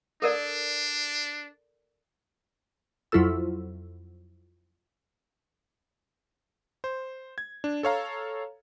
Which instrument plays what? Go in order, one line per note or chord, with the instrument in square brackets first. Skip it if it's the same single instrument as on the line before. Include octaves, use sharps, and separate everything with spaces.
[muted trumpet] D4 [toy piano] A4 A#4 D5
[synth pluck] F2 F#3 E4 F4 A4 E6
[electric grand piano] C5
G#6
D4
A4 C#5 F5 A#5